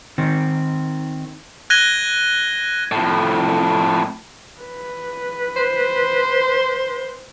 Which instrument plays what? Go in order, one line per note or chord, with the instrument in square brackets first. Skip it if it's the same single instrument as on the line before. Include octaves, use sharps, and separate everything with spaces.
[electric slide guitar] D#3 C4
[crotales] F#6 G#6 A#6 D#7 G7
[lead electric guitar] F2 A2
[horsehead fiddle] B4
[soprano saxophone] C5